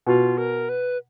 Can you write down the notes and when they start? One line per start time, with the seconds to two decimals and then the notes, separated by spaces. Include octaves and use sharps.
0.07 B2 F4
0.38 A#4
0.69 B4